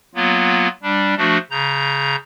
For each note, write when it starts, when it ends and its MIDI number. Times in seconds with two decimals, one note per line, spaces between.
0.15 0.68 54
0.15 0.68 58
0.15 0.68 59
0.15 0.68 65
0.83 1.15 55
0.83 1.15 62
1.18 1.38 53
1.18 1.38 57
1.18 1.38 62
1.18 1.38 66
1.50 2.16 49
1.50 2.16 82
1.50 2.16 91